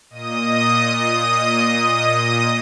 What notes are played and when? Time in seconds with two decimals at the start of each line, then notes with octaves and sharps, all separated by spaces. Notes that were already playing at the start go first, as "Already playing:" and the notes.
0.10 A#2 D#5 D#6